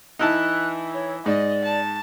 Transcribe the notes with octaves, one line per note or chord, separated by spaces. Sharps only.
E3 D#4 E4 A5 F#6
C#5
G#2 D5 D#5
A5